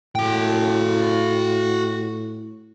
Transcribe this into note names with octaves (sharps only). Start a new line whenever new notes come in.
A2 F#4 G5